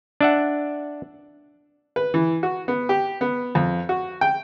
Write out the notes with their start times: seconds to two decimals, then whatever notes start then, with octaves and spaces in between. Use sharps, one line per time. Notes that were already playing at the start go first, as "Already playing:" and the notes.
0.21 D4 E5 F#5
1.96 B4
2.14 E3
2.43 F#4
2.68 B3
2.89 G4
3.21 B3
3.55 F2
3.89 F#4
4.21 G5